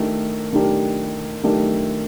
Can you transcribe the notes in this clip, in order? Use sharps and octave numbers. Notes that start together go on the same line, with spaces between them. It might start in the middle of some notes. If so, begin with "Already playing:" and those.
Already playing: D#3 A3 D4 G4 A#4
D#3 A3 D4 G4 A#4
D#3 A3 D4 G4 A#4